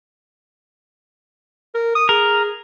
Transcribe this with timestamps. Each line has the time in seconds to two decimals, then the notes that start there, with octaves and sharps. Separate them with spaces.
1.74 A#4
1.95 D#6
2.09 G#4 A#4